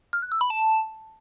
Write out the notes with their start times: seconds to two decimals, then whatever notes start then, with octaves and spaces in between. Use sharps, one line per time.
0.13 F6
0.22 F#6
0.32 E6
0.41 B5
0.50 A5